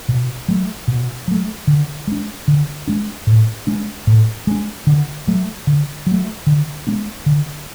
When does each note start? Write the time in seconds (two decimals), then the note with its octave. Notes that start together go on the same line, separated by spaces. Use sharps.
0.09 B2
0.48 F#3 A3
0.88 B2
1.28 F#3 A3
1.67 D3
2.07 G#3 D4
2.48 D3
2.88 G#3 D4
3.27 A2
3.67 G#3 D4
4.07 A2
4.47 G#3 D4
4.87 D3
5.27 F#3 A3
5.67 D3
6.07 F#3 A3
6.47 D3
6.87 G#3 B3 D4
7.26 D3